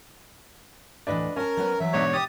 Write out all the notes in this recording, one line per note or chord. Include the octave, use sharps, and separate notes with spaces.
D2 A2 E3 D4 B4 D#5
C#4 A#4 G#5 A5
F#3 B3 B4
E3 F#3 E5
G#2 B2 D4 C#5
G4 D#6 A6